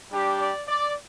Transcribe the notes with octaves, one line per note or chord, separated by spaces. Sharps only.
G3 D4 G4
D5
D5